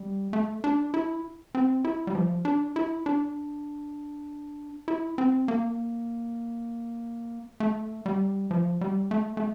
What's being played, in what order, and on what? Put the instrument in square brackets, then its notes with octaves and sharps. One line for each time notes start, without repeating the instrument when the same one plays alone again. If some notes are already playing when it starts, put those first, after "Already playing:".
Already playing: [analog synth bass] G3
A3
D4
E4
C4
E4
G3
F3
D4
E4
D4
E4
C4
A#3
A3
G3
F3
G3
A3
A3